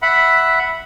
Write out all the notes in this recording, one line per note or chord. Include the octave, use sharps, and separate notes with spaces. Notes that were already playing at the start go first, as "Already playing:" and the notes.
E5 F#5 B5